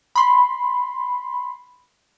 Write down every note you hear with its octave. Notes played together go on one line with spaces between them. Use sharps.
B5 C6